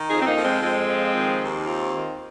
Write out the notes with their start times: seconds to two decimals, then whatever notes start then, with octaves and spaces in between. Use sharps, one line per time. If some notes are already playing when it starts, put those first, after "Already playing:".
Already playing: D#3
0.10 F2 D#4 G#4
0.22 C4
0.27 A#3 D#4
0.36 F3
0.45 G#3 C4
0.62 F2 G#3 C4
0.88 F3
1.15 D#3
1.42 D#2
1.67 D#3 C4 F4
1.94 D#3